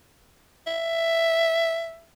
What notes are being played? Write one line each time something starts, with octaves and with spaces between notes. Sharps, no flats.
E5